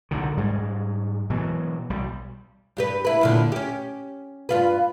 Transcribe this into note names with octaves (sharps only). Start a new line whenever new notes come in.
B1 D3 D#3
G#2 G3 G#3
B2 E3 F#3
B1 G3
G2 G4 B4
E4 B4
F#2 A#2 D3
C#4 G4
G2 F4 B4